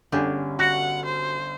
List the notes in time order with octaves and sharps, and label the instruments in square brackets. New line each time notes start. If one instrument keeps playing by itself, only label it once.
[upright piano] G1 C#4 [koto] D3 G4 G#4
[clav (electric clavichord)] F#4 [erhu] F#5
[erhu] C5